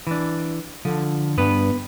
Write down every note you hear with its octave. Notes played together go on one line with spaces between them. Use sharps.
E3 D4
D3 F3
G2 B3 B4